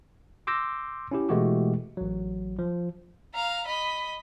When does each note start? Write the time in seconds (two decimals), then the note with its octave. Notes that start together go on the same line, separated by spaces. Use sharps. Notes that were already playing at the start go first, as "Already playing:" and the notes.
0.47 C6 D6 E6 G6 A#6
1.11 C#4 E4 G4
1.29 B2 E3 G#3 A3 F#4 G4
1.97 A1 F#3
2.59 F3
3.34 F5 A#5
3.66 D#5 B5